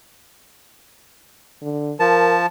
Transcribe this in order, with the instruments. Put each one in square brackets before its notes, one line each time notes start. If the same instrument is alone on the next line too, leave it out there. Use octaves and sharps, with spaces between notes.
[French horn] D3
[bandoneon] F3 A5 [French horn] A#4